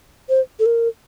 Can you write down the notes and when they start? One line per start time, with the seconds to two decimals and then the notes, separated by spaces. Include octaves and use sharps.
0.29 C5
0.59 A4
0.66 A#4